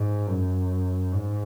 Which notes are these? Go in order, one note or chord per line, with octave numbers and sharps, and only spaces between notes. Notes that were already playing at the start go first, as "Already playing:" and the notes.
Already playing: G#2
F#2
G#2